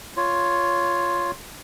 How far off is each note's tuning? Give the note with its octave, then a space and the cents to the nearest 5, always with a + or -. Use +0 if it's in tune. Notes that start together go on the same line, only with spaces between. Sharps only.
F4 +0 C#5 +5